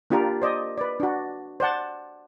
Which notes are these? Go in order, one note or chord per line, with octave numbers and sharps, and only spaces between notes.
A#3 D4 F4 G4 A#4
C5 D5 D#5
B4 D5
D4 F#4
C5 D5 F#5 A5